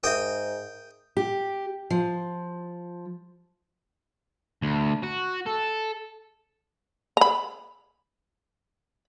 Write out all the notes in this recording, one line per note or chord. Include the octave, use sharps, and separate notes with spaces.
G#2 A#4 E5 G5 D#6
G4
F3
D2
F#4
A4
A#5 B5